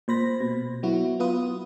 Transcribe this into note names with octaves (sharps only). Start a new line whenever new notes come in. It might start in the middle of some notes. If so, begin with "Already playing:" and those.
A#2 C5 B5 A#6
B2
F#3 B3 E4 F#4
B3 F4 B4 D#6